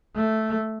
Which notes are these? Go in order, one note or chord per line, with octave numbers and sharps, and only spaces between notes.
A3